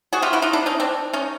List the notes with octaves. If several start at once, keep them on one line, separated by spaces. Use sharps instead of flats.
F#4 G#4
F4 G4
E4 F#4
D#4 F4
D4 E4
C#4 D#4
C4 D4
C#4 D#4